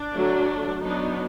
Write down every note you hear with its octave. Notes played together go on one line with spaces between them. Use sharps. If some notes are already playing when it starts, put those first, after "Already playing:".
Already playing: D4
D3 F#3 A3
F#3 B3 D4 D#4